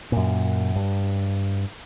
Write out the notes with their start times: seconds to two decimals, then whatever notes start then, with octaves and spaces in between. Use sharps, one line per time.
0.12 F#2 A#2
0.76 G2